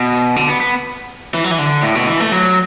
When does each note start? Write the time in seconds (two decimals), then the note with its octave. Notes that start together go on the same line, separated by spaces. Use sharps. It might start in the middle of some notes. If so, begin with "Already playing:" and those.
Already playing: B2
0.36 D3
0.49 B3
0.60 B3
1.34 E3
1.44 F#3
1.51 E3
1.59 D3
1.83 A2
1.95 B2
2.07 E3
2.20 A3
2.32 F#3